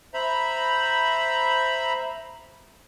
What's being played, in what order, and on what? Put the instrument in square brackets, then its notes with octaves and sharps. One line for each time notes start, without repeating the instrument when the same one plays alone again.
[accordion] C5 E5 A#5 B5